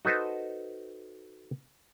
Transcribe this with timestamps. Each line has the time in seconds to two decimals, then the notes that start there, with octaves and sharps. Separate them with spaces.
0.05 D#4 F#4 A4 B4 C5 D#5